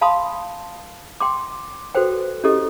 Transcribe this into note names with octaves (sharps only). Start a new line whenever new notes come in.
F5 A5 B5 C6 D#6
G5 C6 D6
F#4 A4 B4 C5 G5
C#4 E4 G4 A4 D#5